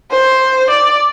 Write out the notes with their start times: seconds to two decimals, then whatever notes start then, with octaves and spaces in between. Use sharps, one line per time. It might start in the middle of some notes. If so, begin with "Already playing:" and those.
0.11 C5
0.70 D5